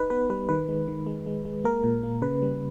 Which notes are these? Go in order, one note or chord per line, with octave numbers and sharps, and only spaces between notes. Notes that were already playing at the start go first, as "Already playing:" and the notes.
Already playing: D#4 B4
B3 B4
G3 B4
D#3 B4
G#3
D#3
G#3
G#3
G#3
A#3 A#4
A#2
A#3
C#3 B4
G3